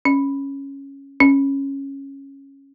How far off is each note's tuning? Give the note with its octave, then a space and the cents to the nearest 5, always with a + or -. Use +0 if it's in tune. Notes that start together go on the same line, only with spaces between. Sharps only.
C#4 -5
C#4 -10